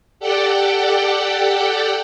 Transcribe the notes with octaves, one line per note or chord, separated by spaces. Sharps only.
G4 A4 D5 F#5 G5